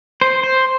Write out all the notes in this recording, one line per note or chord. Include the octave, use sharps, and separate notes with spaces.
C5
C5